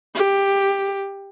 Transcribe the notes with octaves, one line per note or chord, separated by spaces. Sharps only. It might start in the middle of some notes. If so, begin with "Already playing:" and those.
G4